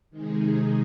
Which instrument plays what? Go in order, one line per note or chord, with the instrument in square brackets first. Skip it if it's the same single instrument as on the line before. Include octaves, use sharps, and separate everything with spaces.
[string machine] C3 D#3 G#3 D#4 G#4